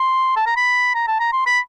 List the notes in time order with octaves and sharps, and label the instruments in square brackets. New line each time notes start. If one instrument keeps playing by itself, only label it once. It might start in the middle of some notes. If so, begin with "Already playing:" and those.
Already playing: [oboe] C6
A5
A#5
B5
A#5
A5
A#5
C6
B5